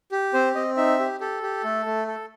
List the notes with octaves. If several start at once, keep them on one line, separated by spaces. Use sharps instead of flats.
G4
C4 C5
C4 D#5
D#4 E5
G4
G4 A4
G4
A3
A3
A4